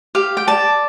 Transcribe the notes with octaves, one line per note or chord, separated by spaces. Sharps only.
G4 F5
G5
D5 A5